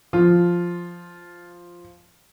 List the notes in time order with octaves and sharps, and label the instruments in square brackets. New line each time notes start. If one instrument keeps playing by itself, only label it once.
[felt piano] F3 [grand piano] F4